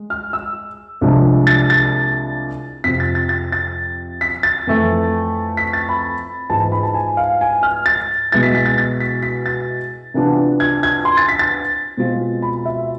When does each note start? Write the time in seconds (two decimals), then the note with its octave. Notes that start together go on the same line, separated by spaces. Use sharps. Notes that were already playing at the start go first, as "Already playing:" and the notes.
Already playing: G#3
0.10 F6
0.33 E6
1.01 C2 C3 F3 G#3 D4
1.47 A6
1.70 A6
2.84 F2 C3 F3 B6
3.00 A6
3.15 A6
3.29 A6
3.52 A6
4.21 B6
4.43 A6
4.67 F2 E3 A3
5.57 B6
5.73 A6
5.89 B5
6.50 G#2 E3 B3 F4 A5
6.60 A5
6.72 B5
6.83 A5
6.94 G#5
7.17 F5
7.41 G#5
7.63 F6
7.86 A6
8.32 B2 G#3 B3 E4 A6
8.43 B6
8.55 B6
8.66 A6
8.78 A6
9.00 B6
9.23 B6
9.46 A6
10.14 C3 E3 B3 D4 F4
10.60 G#6
10.83 G#6
11.05 C6
11.17 A6
11.28 B6
11.39 A6
11.97 B2 G#3 C4 F4
12.42 B5
12.66 E5